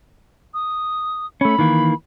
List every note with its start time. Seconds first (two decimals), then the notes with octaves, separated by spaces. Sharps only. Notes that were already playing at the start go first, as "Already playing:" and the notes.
0.54 D#6
1.41 A3 C#4 B5
1.59 D#3 E3 A#3